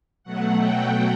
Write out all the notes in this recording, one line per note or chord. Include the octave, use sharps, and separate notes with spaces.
B2 F#3 A3 F#5
G5